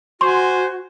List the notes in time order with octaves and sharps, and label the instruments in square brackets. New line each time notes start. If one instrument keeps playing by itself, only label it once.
[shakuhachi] F#4 [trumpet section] C5 G#5 [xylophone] C6 C#6